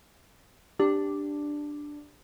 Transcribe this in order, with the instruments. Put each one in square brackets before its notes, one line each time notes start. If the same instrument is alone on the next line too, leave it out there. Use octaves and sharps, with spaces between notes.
[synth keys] D4 [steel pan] G4